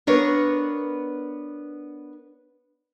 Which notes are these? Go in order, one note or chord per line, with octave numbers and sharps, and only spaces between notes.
B3 D4 A#4 C#5